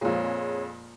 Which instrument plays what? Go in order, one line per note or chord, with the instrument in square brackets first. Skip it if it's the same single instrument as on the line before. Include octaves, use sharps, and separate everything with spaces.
[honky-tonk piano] F2 G#3 [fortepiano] A#2 F3 [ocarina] C#5